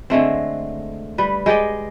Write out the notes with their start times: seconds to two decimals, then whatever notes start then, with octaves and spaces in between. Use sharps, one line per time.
0.10 D3 G#3 A3 C4
1.18 G3 B4
1.46 G#3 G4 D5 D#5